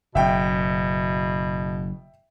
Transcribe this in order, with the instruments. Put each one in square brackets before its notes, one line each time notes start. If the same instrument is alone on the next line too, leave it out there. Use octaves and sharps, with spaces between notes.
[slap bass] F#1 [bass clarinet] B2 [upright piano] E5 G5